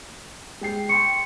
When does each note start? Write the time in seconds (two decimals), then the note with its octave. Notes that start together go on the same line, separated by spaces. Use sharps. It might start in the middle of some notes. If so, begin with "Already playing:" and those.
0.61 G#3 G5 C7
0.89 G5 C6 C#6 C#7